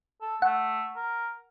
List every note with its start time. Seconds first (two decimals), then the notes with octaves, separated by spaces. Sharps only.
0.22 A4
0.42 A3 F#5
0.96 A#4